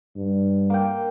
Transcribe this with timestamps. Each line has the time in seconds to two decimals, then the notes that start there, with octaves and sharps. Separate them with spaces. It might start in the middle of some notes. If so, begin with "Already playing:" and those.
0.16 G2
0.70 A#3 G5